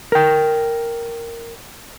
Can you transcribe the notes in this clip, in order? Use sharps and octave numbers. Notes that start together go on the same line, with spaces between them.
A#4 G5